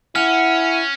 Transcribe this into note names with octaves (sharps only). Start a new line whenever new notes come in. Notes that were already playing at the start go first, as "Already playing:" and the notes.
C#4 E4 F#5 F6